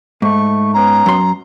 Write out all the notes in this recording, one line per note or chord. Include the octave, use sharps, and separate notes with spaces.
G#2 A3 C#6
B3 C#4 A#5
F#2 C6